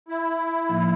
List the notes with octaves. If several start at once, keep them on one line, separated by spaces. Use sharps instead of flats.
E4
A2 F3 A#3 D#4